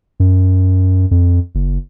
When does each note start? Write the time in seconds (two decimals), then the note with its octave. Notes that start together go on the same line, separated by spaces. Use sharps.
0.20 F#2
1.11 F2
1.55 F#1